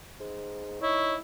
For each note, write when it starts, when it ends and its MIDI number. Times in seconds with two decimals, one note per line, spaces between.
0.20 0.79 44
0.81 1.15 63
0.81 1.21 64
0.81 1.15 73